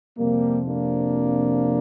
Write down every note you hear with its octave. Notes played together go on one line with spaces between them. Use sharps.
F2 C3 F3 G3 A#3
A#3 D4